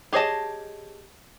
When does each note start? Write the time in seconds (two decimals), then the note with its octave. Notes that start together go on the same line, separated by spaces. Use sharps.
0.13 G4 G#4 C#5 D#5 A5